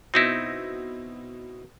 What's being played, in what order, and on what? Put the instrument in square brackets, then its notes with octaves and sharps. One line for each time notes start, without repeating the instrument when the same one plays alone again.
[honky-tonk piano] B2 A#6 [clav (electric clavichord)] C4 D#4 E4